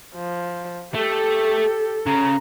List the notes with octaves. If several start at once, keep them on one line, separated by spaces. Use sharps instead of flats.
F3
A3 G4 A4
C#3 A#5